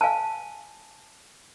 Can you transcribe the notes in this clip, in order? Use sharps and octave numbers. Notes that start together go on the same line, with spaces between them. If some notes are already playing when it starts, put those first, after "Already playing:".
F5 G#5 A5